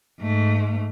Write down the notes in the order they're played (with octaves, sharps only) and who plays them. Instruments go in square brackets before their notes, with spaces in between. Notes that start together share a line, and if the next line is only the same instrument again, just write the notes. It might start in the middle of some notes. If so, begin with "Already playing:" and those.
[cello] G#2 A3